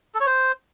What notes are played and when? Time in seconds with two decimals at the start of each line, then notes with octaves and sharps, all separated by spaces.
0.15 A4
0.20 C#5
0.26 C5